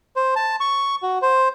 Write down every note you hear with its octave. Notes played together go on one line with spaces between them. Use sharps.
C5
A5
C#6
F#4
C5